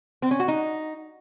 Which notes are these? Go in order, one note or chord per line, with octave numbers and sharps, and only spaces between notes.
C4
C#4
F#4
D#4